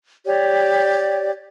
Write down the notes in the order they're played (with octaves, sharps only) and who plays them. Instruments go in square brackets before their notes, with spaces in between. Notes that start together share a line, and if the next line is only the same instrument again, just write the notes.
[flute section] G4 C#5 D5